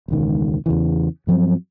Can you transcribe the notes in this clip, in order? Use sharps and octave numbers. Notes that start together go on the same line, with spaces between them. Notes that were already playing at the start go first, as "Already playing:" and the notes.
E1 C#2 D#3
E2 C#3 E3
G2 F3 F#3 C4